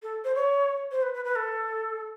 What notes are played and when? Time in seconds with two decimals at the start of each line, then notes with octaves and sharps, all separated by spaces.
0.02 A4
0.24 C5
0.35 C#5
0.91 C5
1.02 B4
1.14 B4
1.25 B4
1.35 A4